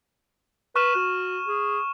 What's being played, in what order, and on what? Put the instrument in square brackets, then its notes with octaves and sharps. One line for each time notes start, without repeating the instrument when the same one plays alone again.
[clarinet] B4 [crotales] C#6 F6 E7
[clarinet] F#4
G#4